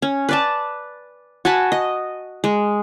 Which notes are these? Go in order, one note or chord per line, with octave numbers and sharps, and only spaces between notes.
C#4
B4 D5 A5
F#4 G#5 A5 B5
D#5
G#3